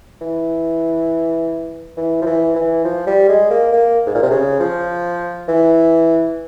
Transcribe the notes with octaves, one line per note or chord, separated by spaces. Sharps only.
E3
E3
F3
E3
E3
F3
G3
G#3
A#3
A#3
G#2
A#2
C3
C#3
F3
E3